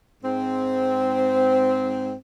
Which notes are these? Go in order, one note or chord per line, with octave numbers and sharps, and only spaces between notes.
G#2 C4